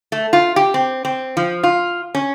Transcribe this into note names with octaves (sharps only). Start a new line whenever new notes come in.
A3
F4
G4
C4
C4
F3
F4
C#4